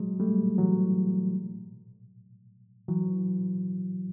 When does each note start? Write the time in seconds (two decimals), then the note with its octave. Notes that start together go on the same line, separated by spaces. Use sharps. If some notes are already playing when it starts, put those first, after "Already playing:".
Already playing: F#3 G#3
0.20 G3 A3
0.58 E3 F#3
2.88 E3 F#3